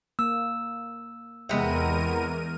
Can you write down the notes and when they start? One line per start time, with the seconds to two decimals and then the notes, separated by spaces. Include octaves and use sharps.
0.19 A#3 E6
1.49 E2 C3 G#3 B3 A#4 D#5 E5 D#7